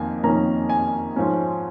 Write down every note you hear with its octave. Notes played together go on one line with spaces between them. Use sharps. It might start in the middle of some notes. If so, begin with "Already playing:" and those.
Already playing: F2 D#3 A#3 G#5
F2 D#3 A#3 C#4 A#5
G#5
G#2 F3 C#4